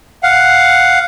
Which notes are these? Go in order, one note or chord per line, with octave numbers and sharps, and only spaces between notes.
F5 F#5